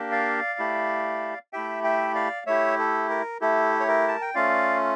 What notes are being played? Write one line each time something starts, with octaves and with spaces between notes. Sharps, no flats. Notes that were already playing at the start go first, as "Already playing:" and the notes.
Already playing: A#3 D4 G4
D5 F5
A3 E4 G4
A3 E4 G4 E5 G5
E5 G5
D5 F5
A3 E4 G4 C#5 E5
A4
A#4
A3 E4 G4 A4
C#5
A#4
A5
G5
A3 C#4 F4 D5 F5